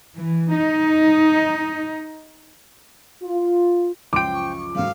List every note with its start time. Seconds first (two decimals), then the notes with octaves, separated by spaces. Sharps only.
0.15 E3
0.54 D#4
3.23 F4
4.13 C#2 F#2 F3 C5 G5 D6 D7
4.33 C#6
4.75 F#1 G#2 F#3 A3 A4 F5